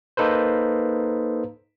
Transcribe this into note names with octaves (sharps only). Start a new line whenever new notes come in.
A#3 D#4 A4 B4 C5